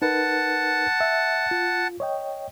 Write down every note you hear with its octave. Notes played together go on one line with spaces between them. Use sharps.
D#4 A#4 B4 F#5 A5
E5
F4
C#5 D#5 G5